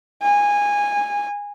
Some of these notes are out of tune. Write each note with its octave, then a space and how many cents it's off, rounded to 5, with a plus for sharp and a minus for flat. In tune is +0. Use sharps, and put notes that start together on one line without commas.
G#5 -20